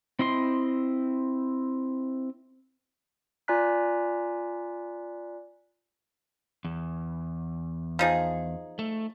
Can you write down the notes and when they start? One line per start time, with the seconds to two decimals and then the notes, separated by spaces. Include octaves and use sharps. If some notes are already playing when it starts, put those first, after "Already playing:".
0.19 C4 E4 D#5 C6
3.48 F4 D5 G#5 A#5 F#6 B6
6.65 E2
7.99 F3 D#4 G#4
8.79 A3